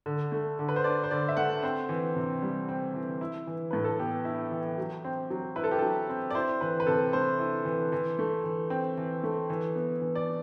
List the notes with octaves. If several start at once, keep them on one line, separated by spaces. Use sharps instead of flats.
D3
A3
D3
B4
C5
D4 D5
C5
D3 D5
E5
A3 F#5
C4 C5
E3
C3
G3
C4
E3
E4
E3
A2 B4
A4
B3 G4
E4
E3
F#3
C4
F#3
E4 B4
A4
G4
F#3 A4
C4
D5
E4 C5
E3 B4
B4
C3 A4
A3 C5
E4
E3
E3
A3
E3
C4
E3
A3
E3
B3
E3
D5